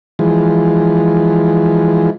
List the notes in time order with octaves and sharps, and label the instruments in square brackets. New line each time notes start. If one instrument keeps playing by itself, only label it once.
[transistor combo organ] E3 F3 G#3